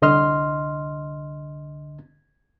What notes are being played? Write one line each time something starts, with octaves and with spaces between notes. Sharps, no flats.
C2 D3 D#5 C6 F6